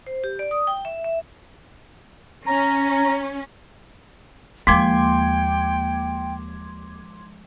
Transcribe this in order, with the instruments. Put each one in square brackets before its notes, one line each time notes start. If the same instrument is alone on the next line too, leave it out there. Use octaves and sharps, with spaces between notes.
[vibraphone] C5
G4
D5
D#6
G5
E5
E5
[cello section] C#4 [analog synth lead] A#5
[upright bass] D#2 A#3 [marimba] F3 G#3 [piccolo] G5 [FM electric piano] C6 D6 G#6